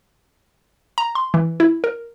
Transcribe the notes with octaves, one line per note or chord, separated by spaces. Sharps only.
A#5
C6
E3
E4
A#4